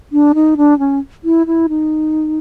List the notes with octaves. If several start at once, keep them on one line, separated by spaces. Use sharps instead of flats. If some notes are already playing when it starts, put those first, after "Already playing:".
D4
D#4
D4
C#4
E4
E4
D#4